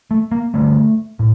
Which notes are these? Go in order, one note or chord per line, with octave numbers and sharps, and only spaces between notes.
A3
A#3
G2 D3 A3
A2